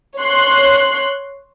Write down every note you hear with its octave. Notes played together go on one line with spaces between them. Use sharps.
C#5 C6 F#6